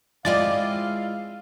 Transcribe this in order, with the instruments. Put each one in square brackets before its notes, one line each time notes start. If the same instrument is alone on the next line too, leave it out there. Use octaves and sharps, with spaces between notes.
[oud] G#3 C4 [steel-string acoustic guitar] E4 F4 D#5 [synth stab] D5 [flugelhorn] F5